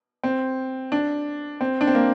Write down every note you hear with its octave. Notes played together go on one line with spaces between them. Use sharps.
C4
D4
C4
D4
C4
A#3